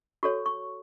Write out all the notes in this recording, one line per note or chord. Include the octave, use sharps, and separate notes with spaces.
F#4 A4 C#5 C#6
C#6